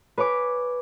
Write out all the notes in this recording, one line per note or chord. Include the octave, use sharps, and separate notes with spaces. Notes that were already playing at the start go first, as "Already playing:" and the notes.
B4 C#5 G#5 D6